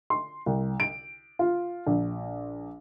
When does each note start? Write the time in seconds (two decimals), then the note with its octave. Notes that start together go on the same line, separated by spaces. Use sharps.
0.10 C6
0.46 C2
0.80 D7
1.39 F4
1.87 A#1